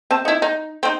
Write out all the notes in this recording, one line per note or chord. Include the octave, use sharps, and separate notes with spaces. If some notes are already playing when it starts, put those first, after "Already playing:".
C4 C5 A5
D#4 E4
D#4
C4 D#4